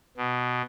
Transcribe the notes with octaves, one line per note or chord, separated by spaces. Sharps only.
B2